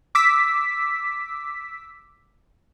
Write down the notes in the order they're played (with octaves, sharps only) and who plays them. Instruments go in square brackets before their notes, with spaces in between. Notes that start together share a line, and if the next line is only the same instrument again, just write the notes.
[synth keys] D6 E6 B6